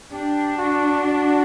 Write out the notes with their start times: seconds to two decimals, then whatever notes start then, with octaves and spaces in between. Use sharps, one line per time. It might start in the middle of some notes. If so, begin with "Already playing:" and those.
0.12 D4 G4
0.58 F#4
1.04 F#4